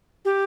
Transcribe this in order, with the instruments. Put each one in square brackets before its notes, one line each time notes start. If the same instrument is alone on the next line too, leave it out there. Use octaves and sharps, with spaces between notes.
[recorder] G4